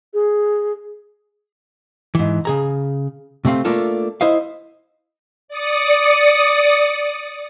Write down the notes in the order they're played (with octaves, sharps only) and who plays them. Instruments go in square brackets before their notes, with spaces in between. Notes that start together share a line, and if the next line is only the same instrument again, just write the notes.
[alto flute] G#4
[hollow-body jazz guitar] G#2 E3
C#3 G#4 A#5
C3 A3 C4 F5
A3 A#3 D4 F4 A4
E4 C5 D#5 F5
[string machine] D5 D#6 C#7